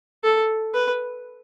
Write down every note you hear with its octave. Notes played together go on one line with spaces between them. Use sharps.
A4
B4